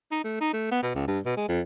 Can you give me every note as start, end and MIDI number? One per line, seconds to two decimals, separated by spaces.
0.11 0.19 63
0.24 0.37 57
0.41 0.52 63
0.53 0.67 57
0.71 0.81 59
0.83 0.91 47
0.95 1.06 37
1.07 1.19 43
1.25 1.34 47
1.37 1.46 56
1.48 1.61 41